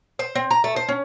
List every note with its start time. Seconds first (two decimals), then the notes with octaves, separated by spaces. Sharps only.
0.19 C5
0.35 C4
0.51 A#5
0.64 A3
0.76 C5
0.88 C#4